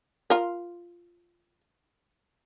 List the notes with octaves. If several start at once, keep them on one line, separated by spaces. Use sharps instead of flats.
F4 A#4